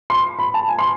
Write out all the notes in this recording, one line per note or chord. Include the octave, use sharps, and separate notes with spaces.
C6
B5
A5
G#5
C6